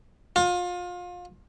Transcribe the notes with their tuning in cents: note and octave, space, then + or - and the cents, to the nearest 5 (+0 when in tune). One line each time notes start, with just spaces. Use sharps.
F4 +30